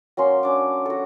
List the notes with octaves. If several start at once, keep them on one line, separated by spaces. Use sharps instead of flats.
F#3 A#3 C#4 C6
C#4 D4 D6
F#4 A4